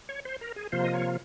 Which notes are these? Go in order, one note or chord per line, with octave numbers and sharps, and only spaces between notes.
C#5
C5
A#4
G#4
C3 F3 A#3 F4 C5
D#5
C#5